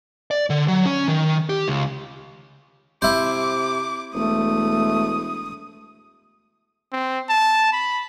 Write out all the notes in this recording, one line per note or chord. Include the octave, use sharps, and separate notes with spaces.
D5
D3
F#3
C#4
D#3
G4
C#2
C3 E4 C5 D6
E1 A3 D#6
C4
A5
B5